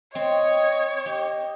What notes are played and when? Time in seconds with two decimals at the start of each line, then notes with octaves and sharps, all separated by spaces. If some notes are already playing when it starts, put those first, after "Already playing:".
0.15 C4 C#5 D#5
1.06 G4 D#5